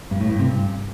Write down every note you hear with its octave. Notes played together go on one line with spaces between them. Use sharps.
G2
A2
G2
C3
G2